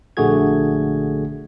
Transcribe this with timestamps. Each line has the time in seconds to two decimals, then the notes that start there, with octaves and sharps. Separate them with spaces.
0.17 A#1 D3 A3 F#4 G#4 G#6